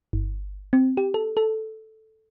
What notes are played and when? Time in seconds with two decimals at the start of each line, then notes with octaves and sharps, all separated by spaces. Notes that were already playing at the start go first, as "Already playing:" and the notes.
0.13 G1
0.73 C4
0.97 G4
1.14 A4
1.37 A4